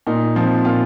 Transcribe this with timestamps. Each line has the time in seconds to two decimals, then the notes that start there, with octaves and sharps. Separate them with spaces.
0.07 A#2 D#4
0.35 F3 C4
0.65 A#2 F4